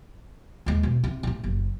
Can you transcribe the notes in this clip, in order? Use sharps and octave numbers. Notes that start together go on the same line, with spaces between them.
D#2 G#3
B2
C3
A2 C3
F#1